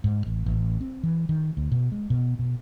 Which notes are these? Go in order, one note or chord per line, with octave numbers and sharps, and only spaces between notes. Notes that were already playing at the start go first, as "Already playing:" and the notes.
G#2
A1
A1
C4
E3
D#3
D2
B2
G#3
B2
B2